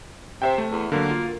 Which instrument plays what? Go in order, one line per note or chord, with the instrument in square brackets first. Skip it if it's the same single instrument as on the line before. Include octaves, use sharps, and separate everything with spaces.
[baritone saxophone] C3 [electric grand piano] C5 E5 G5
[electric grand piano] A3
[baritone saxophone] E2
[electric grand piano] D3 F#3 [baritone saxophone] A#3
[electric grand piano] F4